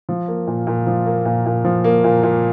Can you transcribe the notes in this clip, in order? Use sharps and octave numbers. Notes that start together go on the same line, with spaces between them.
F3
A#3
A#2
A#2
F3
A#3
A#2
A#2
F3
A#3
A#2
A#2